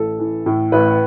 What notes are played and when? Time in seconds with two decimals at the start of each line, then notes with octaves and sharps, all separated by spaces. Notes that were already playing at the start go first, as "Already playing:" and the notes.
Already playing: A1 A4
0.19 E3
0.46 A2
0.72 A1 B4